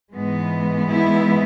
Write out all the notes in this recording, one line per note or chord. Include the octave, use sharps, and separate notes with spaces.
G#2 E3 G#3 B3
E4